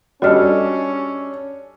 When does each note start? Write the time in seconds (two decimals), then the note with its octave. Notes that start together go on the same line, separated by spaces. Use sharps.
0.22 G3 C#4 D4 F#4 A4 D#5 F6